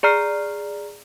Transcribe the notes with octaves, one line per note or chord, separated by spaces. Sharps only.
G#4 D5 A#5 F6 C7